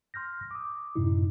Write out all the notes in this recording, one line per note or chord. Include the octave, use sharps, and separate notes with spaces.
C6 F6 G6 A#6
D6 D#6
F#2 A2 C3 D#4 E4